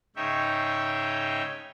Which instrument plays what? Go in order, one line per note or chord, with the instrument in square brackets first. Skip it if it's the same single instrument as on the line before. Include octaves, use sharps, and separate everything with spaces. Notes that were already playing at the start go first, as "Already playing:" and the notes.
[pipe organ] G#2 C#3 D#4 C#5 E5 G5